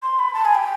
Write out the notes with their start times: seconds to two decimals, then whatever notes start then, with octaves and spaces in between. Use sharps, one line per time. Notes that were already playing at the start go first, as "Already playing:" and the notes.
0.03 C6
0.19 B5
0.34 A5
0.45 G#5
0.55 G5